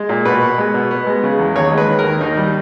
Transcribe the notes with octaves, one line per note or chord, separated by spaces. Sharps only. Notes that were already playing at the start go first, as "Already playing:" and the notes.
Already playing: G#3
A#2
B2 B4
B3
G#3
B2
B3
G#3
C#3
E2
D#2 C#5
G#3
B4
D#3
A#4
D#2
D#2 D#4
G3